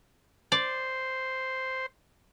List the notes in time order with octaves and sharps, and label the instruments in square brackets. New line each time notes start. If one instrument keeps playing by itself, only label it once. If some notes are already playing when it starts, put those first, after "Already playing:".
[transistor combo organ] C5 [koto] D5